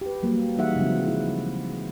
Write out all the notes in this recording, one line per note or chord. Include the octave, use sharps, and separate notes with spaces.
G4 B4
F#3 G3 A#3
E3 G3 D#4 G#4 E5 F#5
C#3 F3 F#3 G#3 C4
E4